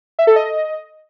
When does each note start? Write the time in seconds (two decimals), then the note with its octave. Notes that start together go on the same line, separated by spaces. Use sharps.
0.19 E5
0.27 A4
0.36 D#5